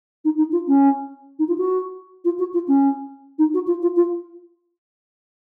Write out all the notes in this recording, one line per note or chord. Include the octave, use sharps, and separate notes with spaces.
D#4
D#4
F4
C#4
D#4
F4
F#4
F4
F#4
F4
C#4
D#4
F#4
F4
F4
F4